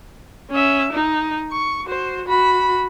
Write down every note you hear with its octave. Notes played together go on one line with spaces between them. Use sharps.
C#4 E5
D#4
C#6
F#4 C5
F#4 B5